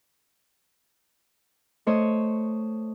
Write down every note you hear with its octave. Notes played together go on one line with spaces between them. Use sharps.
A3 C5 C#5 D#5